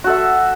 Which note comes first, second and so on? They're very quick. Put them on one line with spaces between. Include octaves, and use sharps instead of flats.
F#4 A4 E5